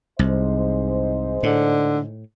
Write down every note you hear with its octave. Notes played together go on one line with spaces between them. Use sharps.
C2 G#2 C5 D#5
A2 D3